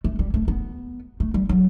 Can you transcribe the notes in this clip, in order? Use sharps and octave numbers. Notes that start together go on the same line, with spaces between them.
A3
G3
A3
B3
A3
G3
F#3